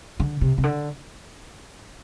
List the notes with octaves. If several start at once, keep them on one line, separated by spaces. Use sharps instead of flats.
D3
C3
C3
D3